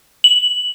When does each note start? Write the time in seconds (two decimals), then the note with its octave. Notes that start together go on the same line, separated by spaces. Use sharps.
0.24 F#7